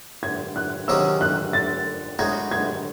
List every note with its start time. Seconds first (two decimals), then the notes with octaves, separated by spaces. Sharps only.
0.23 G#6
0.56 F#6
0.88 C3 D#3 F#3 C#4 G#4 E6
1.21 F#6
1.53 A6
2.19 A2 G#3 D#4 F#4 G#6
2.51 G#6